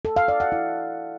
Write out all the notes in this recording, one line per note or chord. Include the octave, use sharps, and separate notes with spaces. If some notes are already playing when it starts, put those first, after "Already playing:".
A4
F5
D5
F#5
E4